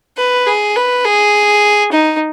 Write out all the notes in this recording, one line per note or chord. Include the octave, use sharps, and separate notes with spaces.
B4
G#4
B4
G#4
D#4